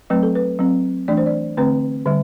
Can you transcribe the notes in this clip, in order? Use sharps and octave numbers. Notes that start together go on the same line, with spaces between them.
F#3 A3 C4 B4
A4
B4
F#3 C4
E3 A3 D4 D5
C5
D5
D3 A3 C4 B4
D3 G3